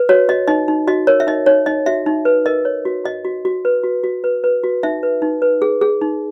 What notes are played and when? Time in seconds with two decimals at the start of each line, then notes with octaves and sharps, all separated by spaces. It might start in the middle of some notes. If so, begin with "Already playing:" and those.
Already playing: B4
0.09 F#4 C#5
0.28 F#4 D#5
0.48 D#4 D#5
0.68 D#4
0.87 F#4 D#5
1.07 A#4 C#5
1.20 E5
1.27 D#4 D#5
1.46 D#4 C#5
1.66 D#4 D#5
1.86 F#4 E5
2.06 D#4
2.25 B4
2.46 A#4 D#5
2.65 C#5
2.85 F#4
3.04 F#4 D#5
3.25 F#4
3.45 F#4
3.65 B4
3.83 F#4
4.04 F#4
4.24 B4
4.44 B4
4.64 F#4
4.83 D#4 E5
5.03 B4
5.22 D#4
5.42 B4
5.62 G#4
5.81 G#4
6.01 D#4